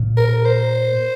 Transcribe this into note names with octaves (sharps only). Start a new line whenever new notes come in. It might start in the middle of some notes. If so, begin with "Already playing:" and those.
Already playing: A#2
A#4
C5